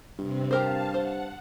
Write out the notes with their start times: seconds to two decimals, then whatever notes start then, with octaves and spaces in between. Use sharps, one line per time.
0.19 G2 C3 C4
0.51 G4 A#4 C5 F5 A5
0.94 C5 F#5